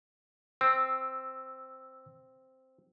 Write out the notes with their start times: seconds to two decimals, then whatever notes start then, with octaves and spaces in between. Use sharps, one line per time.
0.61 C4 E6